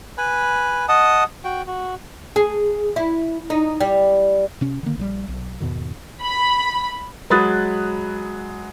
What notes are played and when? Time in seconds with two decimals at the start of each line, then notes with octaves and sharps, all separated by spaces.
0.18 B4 G#5 B5
0.89 D#5 F#5 A5 D#6
1.44 F#4 G5
1.67 F#4
2.36 G#4
2.96 E4
3.50 D#4
3.81 G3
4.61 C3 C#4
4.83 D3 D#3 A#3
4.98 A#1 D3 G3
5.28 B1
5.60 E2 G#2 B2 D#3
6.22 B5
7.30 F#3 G#3 B5 D#6 F#6 A6